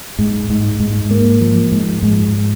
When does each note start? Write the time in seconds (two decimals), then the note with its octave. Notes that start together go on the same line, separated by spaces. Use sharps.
0.19 G#2
0.50 G#2
0.80 G#2
1.11 A#3
1.41 F3
1.72 G#2
2.03 G#2